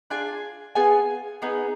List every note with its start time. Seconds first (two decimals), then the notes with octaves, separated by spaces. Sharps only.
0.10 D4 F4 G#4 G#5
0.75 B3 F4 G#4 G#5
1.42 B3 D#4 G#4